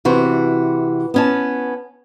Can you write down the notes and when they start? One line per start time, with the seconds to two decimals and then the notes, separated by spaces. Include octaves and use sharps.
0.05 C3 E3 F#4
1.14 B3 C#4 A5